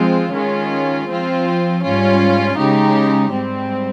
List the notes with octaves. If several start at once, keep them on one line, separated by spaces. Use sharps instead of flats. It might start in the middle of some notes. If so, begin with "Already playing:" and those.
Already playing: F3 G#3 C4 F4
D#3 G#3 C#4 F4
F3 C4 F4
G#2 G3 C#4 F4
C#3 G#3 D#4 G4
G#2 G3 C4